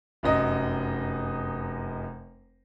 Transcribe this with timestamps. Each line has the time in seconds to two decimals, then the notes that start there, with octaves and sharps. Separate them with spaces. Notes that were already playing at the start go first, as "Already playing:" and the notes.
0.23 F1 F#2 D#5